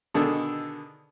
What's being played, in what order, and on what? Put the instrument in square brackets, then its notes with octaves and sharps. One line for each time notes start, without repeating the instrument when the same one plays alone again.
[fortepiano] B2 D3 D#3 D4 G#4 A4